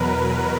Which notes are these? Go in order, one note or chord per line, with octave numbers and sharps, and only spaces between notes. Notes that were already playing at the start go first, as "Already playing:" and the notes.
Already playing: E2 B2 F#3 A#4 B4